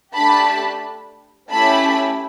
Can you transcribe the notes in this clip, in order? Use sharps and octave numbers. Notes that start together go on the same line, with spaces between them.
A3 D4 G4 A5 B5
A3 C#4 E4 G4 A5 B5